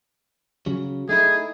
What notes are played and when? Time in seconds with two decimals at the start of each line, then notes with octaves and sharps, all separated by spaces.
0.66 C#3 F#3
1.09 A3 D#4 E4 G#4